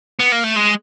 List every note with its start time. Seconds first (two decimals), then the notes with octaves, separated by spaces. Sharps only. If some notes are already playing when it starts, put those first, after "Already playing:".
0.20 B3
0.32 A#3
0.44 A3
0.56 G#3